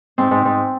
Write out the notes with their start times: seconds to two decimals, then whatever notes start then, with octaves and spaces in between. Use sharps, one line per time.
0.18 G#2 C4
0.31 G#2
0.45 G#2